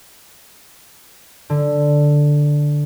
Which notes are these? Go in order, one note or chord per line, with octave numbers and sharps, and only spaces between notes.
D3